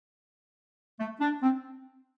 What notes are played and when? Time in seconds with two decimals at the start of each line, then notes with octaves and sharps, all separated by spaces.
0.99 A3
1.20 D4
1.42 C4